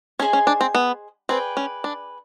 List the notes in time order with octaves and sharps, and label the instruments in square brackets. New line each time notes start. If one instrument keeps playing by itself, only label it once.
[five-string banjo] C#4 [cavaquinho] G#4 C5 D#5 G#5
[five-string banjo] C#4
D4
C4
B3
[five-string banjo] C4 [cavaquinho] G#4 B4 D5 G5
[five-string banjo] C#4
D4